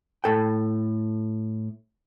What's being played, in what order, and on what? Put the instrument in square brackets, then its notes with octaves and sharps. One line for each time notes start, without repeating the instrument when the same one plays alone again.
[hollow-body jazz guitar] A2 A4 G5